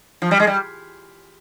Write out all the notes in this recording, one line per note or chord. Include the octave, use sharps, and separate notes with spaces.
F3
G3
G#3
G3